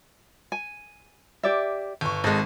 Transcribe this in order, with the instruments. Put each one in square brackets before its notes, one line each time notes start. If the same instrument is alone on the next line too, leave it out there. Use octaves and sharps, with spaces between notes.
[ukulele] G#5
G4 D5 E5
[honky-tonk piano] G1 C#6
[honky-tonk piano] G#1 G#3 [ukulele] A4 D#5